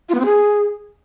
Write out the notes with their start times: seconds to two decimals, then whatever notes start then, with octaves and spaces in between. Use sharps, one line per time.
0.09 F4
0.14 B3
0.20 C4
0.25 G#4